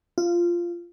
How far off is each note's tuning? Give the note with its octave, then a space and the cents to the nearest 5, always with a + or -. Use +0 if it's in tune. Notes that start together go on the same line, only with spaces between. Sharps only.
F4 -10